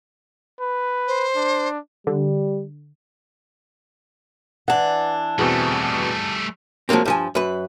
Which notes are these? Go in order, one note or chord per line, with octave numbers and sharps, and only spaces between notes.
B4
C5
D4
D3 G3
E3 D4 F#5
E2 B2 G3 A3 C4 G#4
F3 F#3 G#3 A#3 C4
G2 F3 G#5
F#2 B4